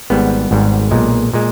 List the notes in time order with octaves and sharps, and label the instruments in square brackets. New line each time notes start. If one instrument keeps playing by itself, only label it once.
[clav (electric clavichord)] G#1 G#2 G3 B3
G#1 G#2 G3
B1 A#2 G#3
A#2 G#3